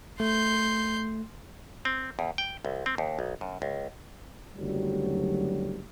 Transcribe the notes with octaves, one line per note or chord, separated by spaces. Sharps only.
A3 C6 G6
C4
E2
G5
C2
C4
D#2
B1
F#2
C#2
F#1 D2 F#3 G3